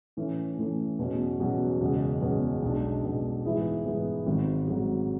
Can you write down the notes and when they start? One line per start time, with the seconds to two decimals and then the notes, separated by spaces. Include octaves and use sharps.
0.17 A2 E3 A3 C#4
0.58 A2 E3 A3 C#4
0.99 E2 B2 F#3 C#4 F#4
1.40 E2 B2 F#3 C#4 F#4
1.81 F#1 E2 B2 G#3 C#4
2.21 F#1 E2 B2 G#3 C#4
2.62 B1 B2 G#3 D4
3.04 B1 B2 G#3 D4
3.45 G#2 E3 B3 E4 G#4
3.85 G#2 E3 B3 E4 G#4
4.27 G#1 G#2 F#3
4.68 G#1 G#2 F#3